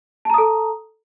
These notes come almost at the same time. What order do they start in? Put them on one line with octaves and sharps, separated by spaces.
A5 A#5 D#6 A4